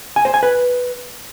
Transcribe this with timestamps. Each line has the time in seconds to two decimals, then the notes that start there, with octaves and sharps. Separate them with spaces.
0.16 G#5
0.25 C5
0.34 G#5
0.43 B4